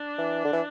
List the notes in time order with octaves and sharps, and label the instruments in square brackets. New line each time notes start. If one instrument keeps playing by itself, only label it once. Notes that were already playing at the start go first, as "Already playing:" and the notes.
Already playing: [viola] D4
[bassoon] E3
D3
E3